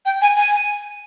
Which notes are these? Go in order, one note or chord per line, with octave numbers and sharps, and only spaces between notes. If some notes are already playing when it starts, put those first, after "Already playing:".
G5
G#5
G#5